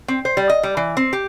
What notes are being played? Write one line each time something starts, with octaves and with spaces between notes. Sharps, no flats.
C4
C5
G3
D#5
G3
E3
C4
G4